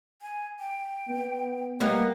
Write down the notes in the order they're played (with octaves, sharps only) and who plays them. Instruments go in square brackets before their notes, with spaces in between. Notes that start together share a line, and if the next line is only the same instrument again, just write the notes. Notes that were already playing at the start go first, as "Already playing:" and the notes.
[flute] G#5
G5
[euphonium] B3
[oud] G3 A#3 B3 [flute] D#5